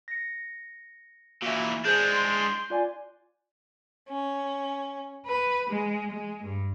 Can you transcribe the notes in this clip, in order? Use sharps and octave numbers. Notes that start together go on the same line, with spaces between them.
A#6 C#7
A#2 E3 F#4 E5
G#3 D4 G#4 C5 G6
C6 D7
F4 D5 G#5
C#4
B4
G#3
G#3
G2